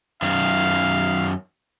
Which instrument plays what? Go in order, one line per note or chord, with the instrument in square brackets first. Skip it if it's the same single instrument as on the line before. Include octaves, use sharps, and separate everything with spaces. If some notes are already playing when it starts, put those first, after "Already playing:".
[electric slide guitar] F#2 D#3 [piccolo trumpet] F5